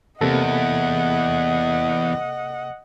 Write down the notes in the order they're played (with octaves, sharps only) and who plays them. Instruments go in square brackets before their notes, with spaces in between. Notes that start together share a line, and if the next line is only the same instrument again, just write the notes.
[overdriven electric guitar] E2 [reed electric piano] C3 A#3 A4 [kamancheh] D#5 F#5